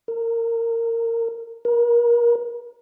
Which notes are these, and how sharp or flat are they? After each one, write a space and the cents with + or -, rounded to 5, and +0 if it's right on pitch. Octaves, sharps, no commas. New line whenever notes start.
A#4 -20
A#4 +30